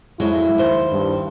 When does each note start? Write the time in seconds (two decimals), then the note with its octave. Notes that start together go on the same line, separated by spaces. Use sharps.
0.20 F2 F#3 G#3 E4
0.58 D#2 C5
0.91 G2